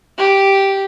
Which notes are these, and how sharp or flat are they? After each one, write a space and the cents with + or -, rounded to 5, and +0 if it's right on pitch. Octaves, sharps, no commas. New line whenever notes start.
G4 -5